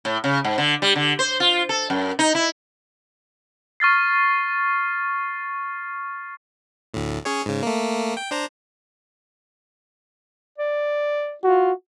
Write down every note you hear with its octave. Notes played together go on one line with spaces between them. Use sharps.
A2
C#3
G#2
D3
G3
D3
C5
F4
A4
F#2
D#4
E4
C#6 F6 A6 C7
D2 A2
C#4 G#4 C#5
G#2 C#3
A3 A#3
G5
D4 C5 A#5
D5
F4 F#4